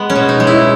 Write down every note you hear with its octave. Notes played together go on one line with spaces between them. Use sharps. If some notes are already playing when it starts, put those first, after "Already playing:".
Already playing: G#3 B3
C#4
B2
D#4
G#3
E4